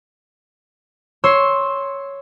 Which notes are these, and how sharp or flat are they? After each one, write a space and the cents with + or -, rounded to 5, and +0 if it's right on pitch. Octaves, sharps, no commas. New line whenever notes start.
C#5 +0 C6 +10 E6 -10